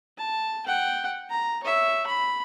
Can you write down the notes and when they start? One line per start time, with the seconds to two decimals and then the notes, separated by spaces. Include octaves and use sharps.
0.18 A5
0.66 F#5 G5
1.30 A#5
1.63 C#5 E5
2.07 B5